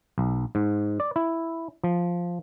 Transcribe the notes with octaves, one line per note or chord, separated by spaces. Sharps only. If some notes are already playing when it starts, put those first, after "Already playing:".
B1
G#2
D5
E4
F3